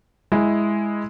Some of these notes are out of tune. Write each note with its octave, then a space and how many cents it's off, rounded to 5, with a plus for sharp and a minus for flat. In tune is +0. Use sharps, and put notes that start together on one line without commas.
G#3 +0 E4 +0